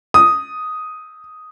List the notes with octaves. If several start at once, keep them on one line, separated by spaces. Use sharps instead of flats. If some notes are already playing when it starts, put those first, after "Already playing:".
D#6